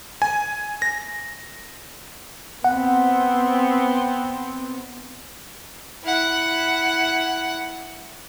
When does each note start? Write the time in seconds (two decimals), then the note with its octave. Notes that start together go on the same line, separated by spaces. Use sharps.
0.22 G#5
0.82 A#6
2.64 B3 C4 F#5
6.04 E4 F#5